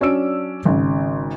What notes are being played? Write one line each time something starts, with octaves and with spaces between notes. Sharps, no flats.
F#3 C#4 D4 D5 E6 D7
G#1 C#3